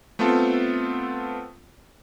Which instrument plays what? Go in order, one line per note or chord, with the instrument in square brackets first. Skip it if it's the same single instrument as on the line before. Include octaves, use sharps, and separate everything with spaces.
[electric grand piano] A3 B3 C4 F4 A4